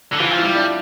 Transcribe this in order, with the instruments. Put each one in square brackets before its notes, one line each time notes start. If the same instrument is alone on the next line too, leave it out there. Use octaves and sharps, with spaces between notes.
[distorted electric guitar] D3
[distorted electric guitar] E3 [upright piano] F4
[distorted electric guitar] F3
[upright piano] E4
[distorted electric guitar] G3
[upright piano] D4